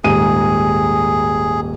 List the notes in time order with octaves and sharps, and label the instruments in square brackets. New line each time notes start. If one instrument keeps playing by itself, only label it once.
[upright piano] D#1 G#2 D#7 [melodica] G#4